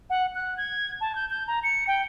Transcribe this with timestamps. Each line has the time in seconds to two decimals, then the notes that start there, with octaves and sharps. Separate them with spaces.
0.10 F#5
0.35 F#6
0.57 G#6
1.01 A5
1.15 G6
1.30 G6
1.47 A#5
1.64 C#7
1.87 G5